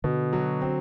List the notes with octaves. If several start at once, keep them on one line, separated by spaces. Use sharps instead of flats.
B2 D3
F#3
C4